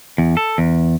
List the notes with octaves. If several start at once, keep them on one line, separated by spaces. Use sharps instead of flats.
E2
A4
E2